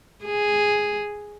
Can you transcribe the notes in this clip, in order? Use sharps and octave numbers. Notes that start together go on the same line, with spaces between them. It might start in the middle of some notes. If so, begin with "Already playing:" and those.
G#4